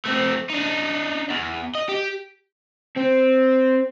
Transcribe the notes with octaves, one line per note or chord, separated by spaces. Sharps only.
A3 C4
D4 D#4
E2
D#5
G4
C4